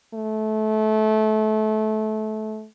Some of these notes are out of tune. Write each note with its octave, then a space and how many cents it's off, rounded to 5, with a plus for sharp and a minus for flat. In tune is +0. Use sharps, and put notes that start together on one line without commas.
A3 -25